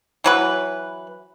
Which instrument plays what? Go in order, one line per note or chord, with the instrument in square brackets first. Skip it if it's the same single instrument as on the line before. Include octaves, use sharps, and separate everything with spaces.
[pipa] E3 F#3 B4